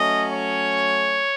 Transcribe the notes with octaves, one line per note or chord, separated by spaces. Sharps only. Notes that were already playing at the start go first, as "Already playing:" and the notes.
Already playing: F#3 A3 C#4 D#5
C#5